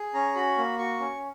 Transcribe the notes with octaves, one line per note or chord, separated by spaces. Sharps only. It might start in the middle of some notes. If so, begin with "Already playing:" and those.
Already playing: G#4
C#4 A#5
F#4 B5
A#3
F#4 C#6
C#4